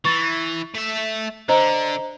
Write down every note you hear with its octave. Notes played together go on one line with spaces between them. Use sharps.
E3 C#6 A6
A3 E5
D3 C5 D#5 A#5